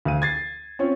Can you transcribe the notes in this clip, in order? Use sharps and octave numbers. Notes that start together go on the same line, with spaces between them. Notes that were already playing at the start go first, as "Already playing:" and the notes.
D2 F5 D#7
G#6 A6 C7
C4 C#4 F4 C#5